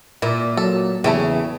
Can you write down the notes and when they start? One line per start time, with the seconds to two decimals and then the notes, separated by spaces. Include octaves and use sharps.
0.22 A#2 E4
0.57 F#3 A4
1.04 E2 C#3 A3 E4 G4